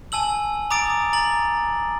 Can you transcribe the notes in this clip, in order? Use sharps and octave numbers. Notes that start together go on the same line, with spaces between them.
G#5 A5 E6 F#7
A#5 D6 D#6 A6 D7
A#5 A6 F#7